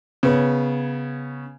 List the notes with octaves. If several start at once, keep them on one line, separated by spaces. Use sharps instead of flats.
C#3 B3 C#5